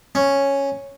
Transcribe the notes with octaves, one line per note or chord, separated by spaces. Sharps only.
C#4